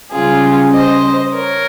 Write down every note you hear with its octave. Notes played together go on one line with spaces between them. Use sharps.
C#3 G3 C#4 F4 G#4
C5 D#5
A#4 C#5